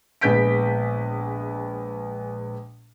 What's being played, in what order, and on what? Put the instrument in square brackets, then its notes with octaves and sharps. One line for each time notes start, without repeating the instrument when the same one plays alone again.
[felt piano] A#1 G#3 B3 G6 B6 D7